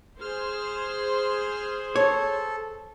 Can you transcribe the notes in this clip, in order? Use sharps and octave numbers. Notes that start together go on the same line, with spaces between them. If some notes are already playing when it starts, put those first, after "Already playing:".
G#4 C5 F6
A4 C#5